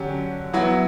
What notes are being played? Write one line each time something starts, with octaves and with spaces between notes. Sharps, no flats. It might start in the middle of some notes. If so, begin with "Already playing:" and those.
Already playing: D3 F#3 C#4 G4
F#3 B3 E4